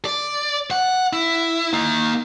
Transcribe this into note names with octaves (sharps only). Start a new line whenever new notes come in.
D5
F#5
E4
A#3 D#4